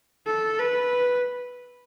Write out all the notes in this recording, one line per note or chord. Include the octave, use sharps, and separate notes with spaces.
A4
B4